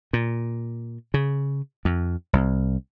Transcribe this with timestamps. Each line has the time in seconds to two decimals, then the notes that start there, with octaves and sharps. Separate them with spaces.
0.13 A#2
1.14 C#3
1.85 F2
2.33 C2